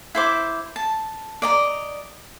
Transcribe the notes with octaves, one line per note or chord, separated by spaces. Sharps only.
E4 C5 D6
A5
D5 D#5 A#5